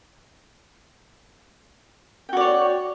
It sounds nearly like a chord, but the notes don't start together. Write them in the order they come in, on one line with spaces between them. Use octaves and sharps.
G5 F#4 D5 C#5